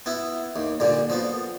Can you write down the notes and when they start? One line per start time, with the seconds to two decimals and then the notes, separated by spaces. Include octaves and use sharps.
0.06 B3 E4
0.56 D#2
0.80 G2 A#2 D3
1.10 F3 B3